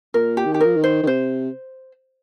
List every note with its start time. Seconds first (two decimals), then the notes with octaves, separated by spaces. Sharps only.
0.14 A#2 A#4
0.37 G4
0.45 D#3
0.54 G4
0.61 F3 A#4
0.77 D#3
0.84 C5
1.03 D#3
1.07 C3 C5